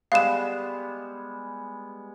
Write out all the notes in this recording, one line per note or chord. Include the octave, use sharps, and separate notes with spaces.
G3 G#3 B3 F5 E7